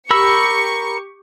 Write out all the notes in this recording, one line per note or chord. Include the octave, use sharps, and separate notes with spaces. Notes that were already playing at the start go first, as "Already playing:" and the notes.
G4 A#4 B5 C#6 E6 C#7